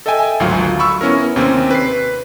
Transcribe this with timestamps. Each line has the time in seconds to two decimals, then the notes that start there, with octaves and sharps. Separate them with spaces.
0.06 A4 D#5 E5 G5 G#5
0.40 G#1 D2 F#3 F4 F5
0.79 B5 C#6 E6
1.01 B3 C#4 E4 A#4
1.36 D#2 C3 C4 C#4
1.71 B4 C7